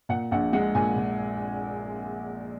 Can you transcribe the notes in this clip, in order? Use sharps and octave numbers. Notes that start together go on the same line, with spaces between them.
A#2 F#5
A#1 F#5
G#3 F#5
A#2 G#5
A#2